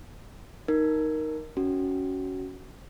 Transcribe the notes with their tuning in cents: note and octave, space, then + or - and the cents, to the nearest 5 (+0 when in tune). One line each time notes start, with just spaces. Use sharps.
D#4 +0 A#4 +0
C#4 +10 F#4 +10